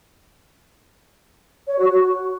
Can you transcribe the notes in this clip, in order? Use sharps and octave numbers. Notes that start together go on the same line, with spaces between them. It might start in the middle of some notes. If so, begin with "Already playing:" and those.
C#5
F#4
F#4